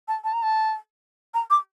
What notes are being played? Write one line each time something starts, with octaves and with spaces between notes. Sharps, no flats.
A5
A5
A#5
A5
A#5
D6